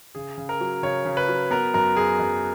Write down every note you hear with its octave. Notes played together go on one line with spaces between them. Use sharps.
C#3 G#4
C#3
A#4
F#3
C#3 C#5
C#3
B4
F#3
B3 A#4
F#2 A#4
F#2 G#4
F#2